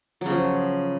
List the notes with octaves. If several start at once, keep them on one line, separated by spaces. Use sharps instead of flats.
C#3 F3 F#3